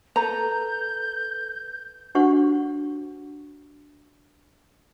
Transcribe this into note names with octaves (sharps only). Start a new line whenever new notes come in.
A4 B4 A#5 G6
D4 F#4 G4 C5 F#5 C#6